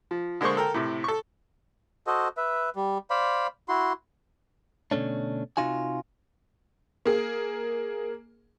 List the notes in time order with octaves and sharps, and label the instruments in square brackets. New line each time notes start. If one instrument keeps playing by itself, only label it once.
[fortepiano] F3
D3 G#3 A#3 G#4 C5 C#6
A4 A#4 G5
A2 C3
A4 C#6
[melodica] F#4 A4 C5 D#5
B4 E5
G3
C5 D5 F5 B5
E4 F#4 C6
[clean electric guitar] B2 D3 A3 C#4 D4
C3 D4 D#4 F4 F#4 G#5
[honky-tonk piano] A#3 G#4